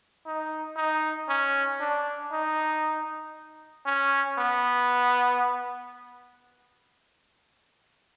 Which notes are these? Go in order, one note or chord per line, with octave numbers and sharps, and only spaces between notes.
D#4
D#4
C#4
D4
D#4
C#4
B3